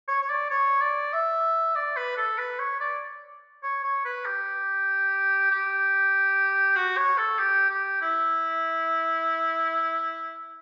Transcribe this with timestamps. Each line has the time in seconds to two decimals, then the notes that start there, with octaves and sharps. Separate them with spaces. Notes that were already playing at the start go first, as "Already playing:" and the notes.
0.08 C#5
0.22 C#5
0.29 D5
0.50 C#5
0.81 D5
1.13 E5
1.75 D5
1.96 B4
2.17 A4
2.38 B4
2.59 C#5
2.80 D5
3.63 C#5
3.84 C#5
4.05 B4
4.26 G4
5.51 G4
6.76 F#4
6.97 C#5
7.17 A4
7.39 G4
7.70 G4
8.01 E4